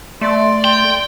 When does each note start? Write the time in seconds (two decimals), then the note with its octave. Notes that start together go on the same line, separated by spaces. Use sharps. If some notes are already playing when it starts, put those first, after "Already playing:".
0.21 A3 D5 C6
0.64 G5